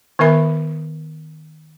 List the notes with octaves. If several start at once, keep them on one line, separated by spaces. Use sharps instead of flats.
D#3 B3 A#4 E5 B5